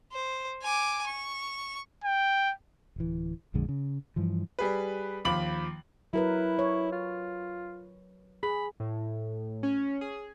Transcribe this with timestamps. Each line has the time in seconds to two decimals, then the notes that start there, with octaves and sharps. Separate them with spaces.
0.12 C5
0.63 G#5 D6
1.07 C#6
2.04 G5
2.96 D1 E3
3.54 A#1 F2 D3 G#3
3.69 C#3
4.16 G2 E3 F3
4.59 G3 G#4 B4
5.25 D#2 F3 B5 D6 F#7
6.13 F#3 E4 A#4 B4
6.59 C#5
6.92 F4
8.43 G#4 B5
8.80 A2
9.63 C#4
10.01 G#4